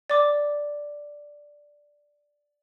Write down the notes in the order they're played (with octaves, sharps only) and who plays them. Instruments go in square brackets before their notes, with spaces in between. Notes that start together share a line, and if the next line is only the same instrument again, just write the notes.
[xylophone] D5 D6